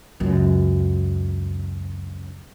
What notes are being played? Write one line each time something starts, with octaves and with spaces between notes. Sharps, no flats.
C#2 F#2